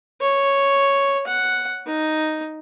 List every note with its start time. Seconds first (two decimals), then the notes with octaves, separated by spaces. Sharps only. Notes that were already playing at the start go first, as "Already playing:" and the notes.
0.21 C#5
1.27 F#5
1.86 D#4